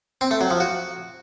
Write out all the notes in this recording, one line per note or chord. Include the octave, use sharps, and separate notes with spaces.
C4
A3
F#3
F3
F#4